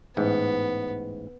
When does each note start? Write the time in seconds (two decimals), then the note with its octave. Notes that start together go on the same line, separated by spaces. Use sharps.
0.17 A1 G#2 B3